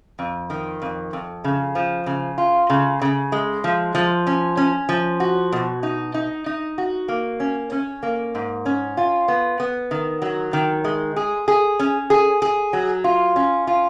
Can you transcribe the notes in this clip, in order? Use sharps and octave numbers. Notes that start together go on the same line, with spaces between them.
F2
D#3
F2
F2
C#3
F3
C#3
F4
C#3
C#3
G#3
F3
F3
C#4
C#4
F3
F#4
B2
D#4
D#4
D#4
F#4
A#3
C#4
C#4
A#3
G#2
C#4
F4
B3
B3
D#3
F#3
D#3
G#3
G#4
G#4
C#4
G#4
G#4
F#3
F4
C#4
F4